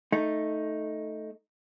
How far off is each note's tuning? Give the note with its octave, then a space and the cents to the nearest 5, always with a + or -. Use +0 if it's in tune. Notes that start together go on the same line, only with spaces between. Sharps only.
A3 +0 D#4 +5